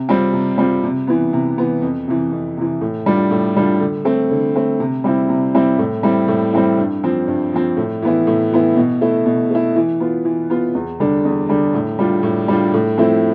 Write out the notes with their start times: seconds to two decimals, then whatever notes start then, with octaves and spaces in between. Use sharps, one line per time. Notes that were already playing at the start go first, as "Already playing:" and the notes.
Already playing: C3
0.09 G3 C4 F4
0.33 C3
0.58 G3 C4 F4
0.84 C3
1.07 E3 B3
1.33 C3
1.58 E3 B3
1.82 F2
2.08 C3 E3
2.32 F2
2.57 C3 E3
2.81 A2
3.06 G3 D4 F4
3.31 A2
3.57 G3 D4 F4
3.81 D3
4.05 A3 C4
4.31 D3
4.56 A3 C4
4.80 C3
5.04 G3 C4 E4
5.29 C3
5.55 G3 C4 E4
5.79 A2
6.03 G3 C4 E4
6.28 A2
6.53 G3 C4 E4
6.78 G2
7.03 F3 C4
7.28 G2
7.53 F3 C4
7.77 A2
8.02 E3 B3 E4
8.27 A2
8.52 E3 B3 E4
8.77 B2
9.01 A3 E4
9.26 B2
9.51 A3 E4
9.76 E3
10.00 B3 F4
10.25 E3
10.50 B3 F4
10.75 E2
11.00 D3 G3 D4
11.25 E2
11.49 D3 G3 D4
11.74 A2
11.99 G3 D4 F4
12.23 A2
12.48 G3 D4 F4
12.74 A2
12.97 F3 A3 C4 E4